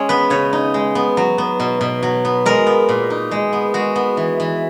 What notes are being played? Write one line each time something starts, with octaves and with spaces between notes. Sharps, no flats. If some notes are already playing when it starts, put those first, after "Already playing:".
Already playing: G#3 C#4 C#5
B3 B4
C#3 C#5
D#4
G#3
B3
F#3
B3
B2
B2
F#3
B3
G#3 A#4
B3
A#2
D#4
G#3
B3
G#3 F#4
B3
E3
E3